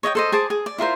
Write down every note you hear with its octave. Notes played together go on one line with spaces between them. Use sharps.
C#5 D#5 E5 G5
A4 C5 D#5
G#4 C5 A5 D6
G#4
D5
E4 F4 A#4 C5